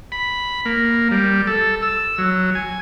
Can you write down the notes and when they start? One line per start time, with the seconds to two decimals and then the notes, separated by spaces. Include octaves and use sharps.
0.12 B5
0.65 A#3
1.11 G3
1.47 A4
1.82 E6
2.18 F#3
2.55 G#5